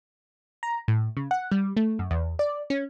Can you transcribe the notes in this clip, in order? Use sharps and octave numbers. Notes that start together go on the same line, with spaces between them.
A#5
A2
C#3
F#5
G3
A3
F#2
E2
D5
C#4